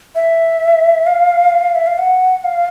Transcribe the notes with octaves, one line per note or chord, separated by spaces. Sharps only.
E5
F5
E5
F5
F#5
F5